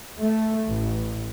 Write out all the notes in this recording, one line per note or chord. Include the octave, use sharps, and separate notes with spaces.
A3
A1